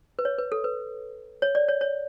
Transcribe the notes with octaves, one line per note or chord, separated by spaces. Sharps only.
B4
C#5
B4
A4
B4
C#5
D5
C#5
C#5